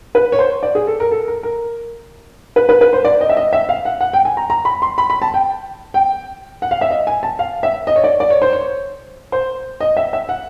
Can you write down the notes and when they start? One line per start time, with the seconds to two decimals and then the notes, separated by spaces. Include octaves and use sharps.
0.15 B4
0.32 C#5
0.39 C5
0.63 D5
0.75 G#4
0.87 A4
1.00 A#4
1.11 A4
1.28 A#4
1.43 A#4
2.56 B4
2.69 B4
2.81 B4
2.93 C5
3.05 D5
3.21 D#5
3.29 E5
3.37 D#5
3.53 E5
3.69 F5
3.85 F#5
4.01 F#5
4.13 G5
4.25 G#5
4.37 A#5
4.50 A#5
4.65 B5
4.82 C6
4.98 B5
5.10 B5
5.22 A5
5.34 G5
5.94 G5
6.62 F#5
6.71 F5
6.81 E5
6.91 D#5
7.07 G#5
7.23 A5
7.39 F5
7.63 E5
7.87 D#5
7.96 C#5
8.04 D5
8.20 D5
8.30 C#5
8.42 C5
8.53 C#5
9.32 C5
9.80 D#5
9.97 E5
10.13 E5
10.29 F#5